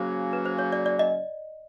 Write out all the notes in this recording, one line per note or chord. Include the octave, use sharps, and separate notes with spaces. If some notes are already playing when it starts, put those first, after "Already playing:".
Already playing: C#3 F#3 A#3 C#4 F#4 C5
B4
C5
C#5
D5
D5
D#5